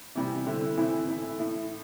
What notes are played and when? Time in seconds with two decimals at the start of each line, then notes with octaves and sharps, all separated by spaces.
0.15 C3 E3 G3
0.47 D3 C4 E4
0.77 A2 E3 C4 E4
1.08 E3 A3 E4
1.39 A2 A3 E4